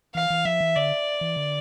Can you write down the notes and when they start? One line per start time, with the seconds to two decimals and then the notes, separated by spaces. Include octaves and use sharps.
0.15 E3 F5
0.30 E3
0.45 F3 E5
0.61 E3
0.76 D3 D5
1.21 E3
1.36 D3